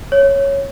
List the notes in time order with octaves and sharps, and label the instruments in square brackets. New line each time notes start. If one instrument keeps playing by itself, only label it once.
[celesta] C#5